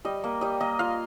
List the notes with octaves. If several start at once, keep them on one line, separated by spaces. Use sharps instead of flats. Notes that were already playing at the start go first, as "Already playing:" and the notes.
G3 D#5
A#3
G3 D#5
A#3 D#5
F4 F5